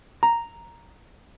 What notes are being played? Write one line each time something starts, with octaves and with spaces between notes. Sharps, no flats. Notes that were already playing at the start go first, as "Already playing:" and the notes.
A#5